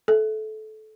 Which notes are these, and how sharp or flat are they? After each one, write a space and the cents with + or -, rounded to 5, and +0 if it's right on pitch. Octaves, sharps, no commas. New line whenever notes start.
A4 -20 E5 +0